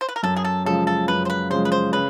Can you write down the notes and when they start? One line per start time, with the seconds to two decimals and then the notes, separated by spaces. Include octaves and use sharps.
0.01 C5
0.09 B4
0.16 A#4
0.23 F#2 A4
0.36 G#4
0.44 A4
0.66 C#3 F3 G#3 A4
0.87 A4
1.08 F#2 B4
1.25 C5
1.30 B4
1.50 C#3 F3 G#3 C5
1.65 B4
1.72 C5
1.93 C#3 B4